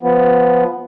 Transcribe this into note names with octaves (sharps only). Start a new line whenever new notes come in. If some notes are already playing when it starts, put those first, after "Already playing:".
F3 B3